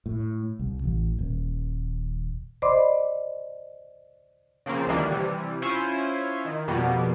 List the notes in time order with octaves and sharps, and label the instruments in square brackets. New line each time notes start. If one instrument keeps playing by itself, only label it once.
[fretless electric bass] A2
C2
A1
D#1
[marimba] C5 D5 D#5 B5 C6 D6
[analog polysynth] C#3 F3 A#3 C4
D2 D#3 E3 G3 A#3 D4
C3 E3 G3
C#4 E4 F4 C5 G#5
D#3
F2 B2 G3 A#3 B3